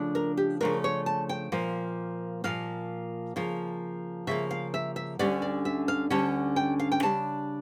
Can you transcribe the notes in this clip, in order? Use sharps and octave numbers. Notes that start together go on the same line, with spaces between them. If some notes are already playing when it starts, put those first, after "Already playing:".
Already playing: C#3 F3 A3 D4
A#4
G4
C#3 F3 A3 D4 A#4
C#5
A5
G5
A#2 F3 A#3
A#2 F3 A#3 F5
C#3 F3 A#3
C#3 F3 A#3 E5
F5
E5
E5
D2 D3 G3 C#4 D5
D5
E5
F5
D2 D3 G3 C#4 A5
G5
F5
G5
C#3 G3 D4 A5